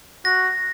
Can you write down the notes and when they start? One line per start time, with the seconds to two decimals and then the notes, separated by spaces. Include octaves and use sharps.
0.25 F#4 A#6